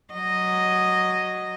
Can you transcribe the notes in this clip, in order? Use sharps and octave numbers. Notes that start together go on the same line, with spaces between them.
F#3 D#5